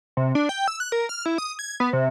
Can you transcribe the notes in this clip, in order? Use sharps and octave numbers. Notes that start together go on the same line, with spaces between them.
C3
D4
G5
E6
F#6
A#4
F6
E4
D#6
G#6
B3
C3